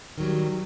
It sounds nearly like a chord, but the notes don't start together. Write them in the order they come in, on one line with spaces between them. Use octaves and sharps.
D#3 F#3 G3